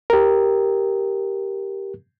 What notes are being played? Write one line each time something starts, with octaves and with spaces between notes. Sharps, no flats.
G4 A#4